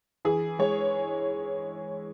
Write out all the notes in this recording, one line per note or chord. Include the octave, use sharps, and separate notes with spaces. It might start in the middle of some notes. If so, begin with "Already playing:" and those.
E3 G#4
G#3 C#5